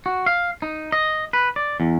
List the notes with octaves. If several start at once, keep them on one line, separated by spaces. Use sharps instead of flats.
F#4
F5
D#4
D#5
B4
D5
E2